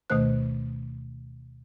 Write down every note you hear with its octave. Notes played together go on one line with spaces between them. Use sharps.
D2 B2 D#3 A3 C5 F#6